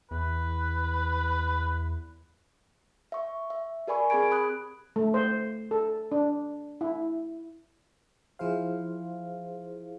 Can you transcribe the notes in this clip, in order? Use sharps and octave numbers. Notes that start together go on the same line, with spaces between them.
E2 B4
E5 C#6
E5
G4 A#4 D5 G#5 B5 C#6
C4 G4 G#4 B5 G#6 D7
B5 D#6 F#6
A3
C5
A4
D4
E4
F3 E4 G#4 C5 F5